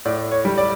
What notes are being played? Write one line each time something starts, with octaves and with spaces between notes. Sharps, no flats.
A2 D5
C#5
G3
D5